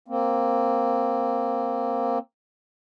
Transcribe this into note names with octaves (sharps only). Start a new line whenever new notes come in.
A#3 C4